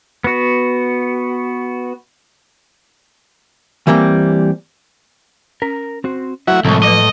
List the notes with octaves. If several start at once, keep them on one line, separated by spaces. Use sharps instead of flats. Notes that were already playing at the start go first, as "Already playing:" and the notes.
B3 F#4
E3 G3 A#3 C4
C#4 A#4
C4 F#4 C5
F#3 A3 E4 F#4 C5 E5
C2 A2 F3 G#3 C#6
F#3 B4 D#5